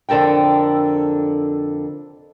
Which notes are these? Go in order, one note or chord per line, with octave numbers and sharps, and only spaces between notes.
F2 D3 A4 A#4 G5